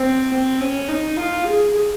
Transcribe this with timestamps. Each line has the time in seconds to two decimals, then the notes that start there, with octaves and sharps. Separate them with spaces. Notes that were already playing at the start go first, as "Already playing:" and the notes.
Already playing: C4
0.33 C4
0.61 C#4
0.89 D#4
1.17 F4
1.46 G#4